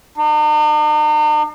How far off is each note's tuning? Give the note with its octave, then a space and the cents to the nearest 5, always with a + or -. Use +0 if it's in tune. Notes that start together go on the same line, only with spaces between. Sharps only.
D#4 -45